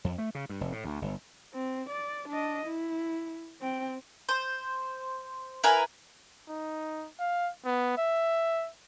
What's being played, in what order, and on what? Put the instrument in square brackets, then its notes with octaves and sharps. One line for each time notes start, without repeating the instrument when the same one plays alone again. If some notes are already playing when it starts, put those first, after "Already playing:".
[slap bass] F2
A3
C#3
G2
F1
A2
D2
G1
[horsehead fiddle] C4
D5
D4 D#5
E4
C4 G5
[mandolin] C5
E4 A#4 B4 G#5
[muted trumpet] D#4
F5
B3
E5